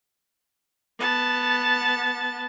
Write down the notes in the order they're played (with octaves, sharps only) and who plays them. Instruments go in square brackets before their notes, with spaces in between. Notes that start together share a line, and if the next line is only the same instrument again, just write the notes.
[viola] B3 A5